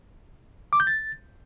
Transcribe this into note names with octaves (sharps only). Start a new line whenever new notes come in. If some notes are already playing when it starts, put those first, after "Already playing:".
D6
G6
A6